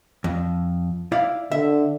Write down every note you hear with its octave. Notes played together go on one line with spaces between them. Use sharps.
F2
E4 D5 F5
D3 E5